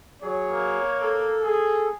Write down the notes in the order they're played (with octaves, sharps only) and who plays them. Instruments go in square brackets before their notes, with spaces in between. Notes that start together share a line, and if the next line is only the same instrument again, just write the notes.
[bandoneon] F#3 G#4 [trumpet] C#5
[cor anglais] A#3
[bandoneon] A4
[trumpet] G#4